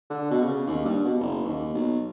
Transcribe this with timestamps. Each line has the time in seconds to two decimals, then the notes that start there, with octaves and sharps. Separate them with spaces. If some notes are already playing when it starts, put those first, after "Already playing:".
0.10 D3
0.30 B2
0.42 C#3
0.67 D#2
0.85 G2
1.04 B2
1.20 F#1
1.45 D#2
1.73 B1